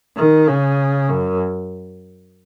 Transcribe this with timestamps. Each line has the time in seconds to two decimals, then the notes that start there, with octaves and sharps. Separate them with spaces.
0.17 D#3
0.48 C#3
1.09 F#2